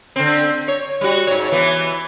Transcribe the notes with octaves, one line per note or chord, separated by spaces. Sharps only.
D3 C4
C#5
G3 F#4
G#2 C#5
E3 B3